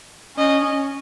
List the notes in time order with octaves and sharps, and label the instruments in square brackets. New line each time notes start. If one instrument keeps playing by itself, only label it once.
[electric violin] C#4 [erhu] D#5